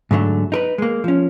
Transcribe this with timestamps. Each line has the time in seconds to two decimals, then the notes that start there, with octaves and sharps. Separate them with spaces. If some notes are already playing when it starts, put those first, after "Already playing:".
0.11 G#2 D3 F#3 A3
0.52 D#4 A#4 B4
0.78 G#3 A#3
1.04 F3 C#4